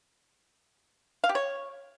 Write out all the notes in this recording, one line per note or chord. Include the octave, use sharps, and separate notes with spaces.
F5
G4
C#5